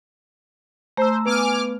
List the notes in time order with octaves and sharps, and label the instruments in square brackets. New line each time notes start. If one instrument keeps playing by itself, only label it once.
[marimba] A3 [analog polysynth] C5 [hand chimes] A#5 E6
[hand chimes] B3 B4 [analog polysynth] G#5 D6 F6